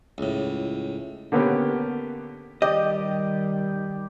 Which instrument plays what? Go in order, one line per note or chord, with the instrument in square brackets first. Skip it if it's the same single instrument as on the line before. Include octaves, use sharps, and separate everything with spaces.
[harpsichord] C#2 A2
[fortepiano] D3 A#3 B3 C#4 G4
[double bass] D#3 G3 [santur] G4 D5 [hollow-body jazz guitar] D#5